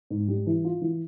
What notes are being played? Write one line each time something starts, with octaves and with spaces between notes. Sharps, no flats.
G#2
G3
E3
F4
E3